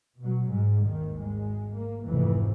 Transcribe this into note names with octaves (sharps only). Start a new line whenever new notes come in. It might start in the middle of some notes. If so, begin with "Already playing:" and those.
B2 F#3
G#2 G#3
G#1 D#2 D#3
G#1 G#3
A#3
F1 F2 G#2 E3